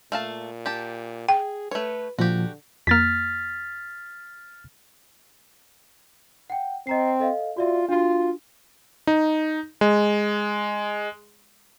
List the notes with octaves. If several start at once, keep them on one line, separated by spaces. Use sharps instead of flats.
A#2 A3 F5 A5
G4 A5
G#4 G5
A3 B4 C#5
A#2 D3 F3 F#4 G4
F2 A#3 F6 A6 B6
F#5 G5
C4 D#5 A#5 C7
A4 D#5 F5
F4 F#4 D5 E5
D4 F4 F#4
D#4
G#3